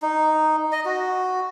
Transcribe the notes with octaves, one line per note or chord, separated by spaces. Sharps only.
D#4
D#5
F#4